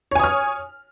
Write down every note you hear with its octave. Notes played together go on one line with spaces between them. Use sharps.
C#5 G#5 D#6 F6